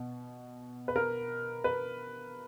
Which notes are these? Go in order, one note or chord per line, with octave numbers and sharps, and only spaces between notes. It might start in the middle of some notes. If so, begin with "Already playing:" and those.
Already playing: B2
B4
A#4
B4